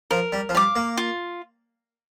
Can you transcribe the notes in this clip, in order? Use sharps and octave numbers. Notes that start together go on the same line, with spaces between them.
F3 A#4
G3
F3
G3 F5 D6
A#3
F4